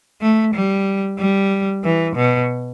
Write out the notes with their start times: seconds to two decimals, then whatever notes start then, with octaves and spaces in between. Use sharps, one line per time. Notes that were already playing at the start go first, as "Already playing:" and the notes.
0.22 A3
0.54 G3
1.19 G3
1.85 E3
2.16 B2